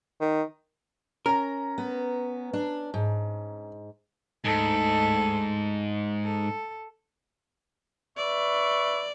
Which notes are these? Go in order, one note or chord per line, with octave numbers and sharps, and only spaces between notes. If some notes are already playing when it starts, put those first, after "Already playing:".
D#3
C#4 A#4 A#5
B3
D4
G#2
D2 G#2 A4
A4
B4 D5 E5 C#6